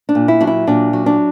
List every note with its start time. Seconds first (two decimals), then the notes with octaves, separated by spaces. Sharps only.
0.09 D4
0.15 A#2
0.28 E4
0.41 F#3 D4
0.47 E4
0.67 A#2 D4
0.93 F#3
1.06 D4